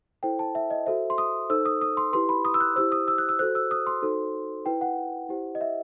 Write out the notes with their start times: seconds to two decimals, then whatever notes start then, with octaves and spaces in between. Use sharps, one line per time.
0.23 E4 A4 C5 G5
0.39 A5
0.55 E5
0.71 D#5
0.86 F#4 A4 C5 E5
1.10 C6
1.18 D#6
1.50 D#4 A4 C5 E6
1.65 D#6
1.81 D#6
1.97 C6
2.13 E4 G4 B4 C6
2.29 B5
2.45 D#6
2.54 E6
2.60 F#6
2.76 E4 G4 C5 E6
2.92 D#6
3.08 E6
3.18 F#6
3.29 E6
3.39 F#4 A4 C5 F#6
3.55 E6
3.71 D#6
3.87 C6
4.02 D#4 F#4 A4 C5
4.66 E4 B4 G5
4.81 F#5
5.29 E4 G4 C5
5.55 D#5
5.61 E5